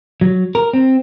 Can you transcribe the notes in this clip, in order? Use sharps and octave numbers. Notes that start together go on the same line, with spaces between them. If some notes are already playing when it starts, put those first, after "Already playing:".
F#3
A#4
C4